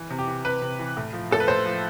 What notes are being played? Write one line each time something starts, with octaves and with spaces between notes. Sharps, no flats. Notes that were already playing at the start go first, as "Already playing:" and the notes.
Already playing: E3
C3
G4
E3
C3 B4
C3
E3
A2
F3
A2 A4
B4
A2 C5
F3